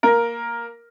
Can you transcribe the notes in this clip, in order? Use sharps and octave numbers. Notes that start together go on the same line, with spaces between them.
A#3 A#4